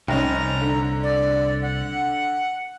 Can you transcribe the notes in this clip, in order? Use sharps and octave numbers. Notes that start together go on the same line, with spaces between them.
F1 C2 C#4 D#4 A#5
D3
D5
F#5